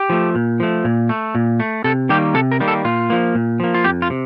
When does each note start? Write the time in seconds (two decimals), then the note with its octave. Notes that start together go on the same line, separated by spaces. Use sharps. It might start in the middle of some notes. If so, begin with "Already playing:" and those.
Already playing: G4
0.10 F3 A3
0.35 A#2
0.60 F3 A3
0.84 A#2
1.09 A3
1.35 A#2
1.60 A3
1.84 C3 A4
2.09 D#3 G3 A#3 G4
2.34 C3 A4
2.51 A#4
2.60 D#3 G3 A#3
2.68 A4
2.84 A#2 F4
3.10 F3 A#3
3.35 A#2
3.60 F3 A#3
3.75 F4
3.84 F2 G4
4.02 F4
4.10 C3